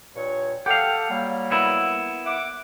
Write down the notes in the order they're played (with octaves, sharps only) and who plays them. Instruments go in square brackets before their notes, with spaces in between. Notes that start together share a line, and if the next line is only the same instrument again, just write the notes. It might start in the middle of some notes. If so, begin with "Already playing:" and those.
[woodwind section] G2 A#2 C#5
[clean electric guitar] G4 F5 [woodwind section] A4 F#5
[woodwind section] F#3 G3 A#3
[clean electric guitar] B3 E4 A#4
[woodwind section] E5 F#5 D6